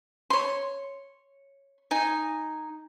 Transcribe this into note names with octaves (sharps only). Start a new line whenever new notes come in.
C#5 C6
D#4 G#5